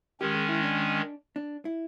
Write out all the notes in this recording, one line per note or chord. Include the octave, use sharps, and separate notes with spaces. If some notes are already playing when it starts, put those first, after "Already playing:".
D#3 G#3 C#4 G4
G#4
E4
D4
D4
E4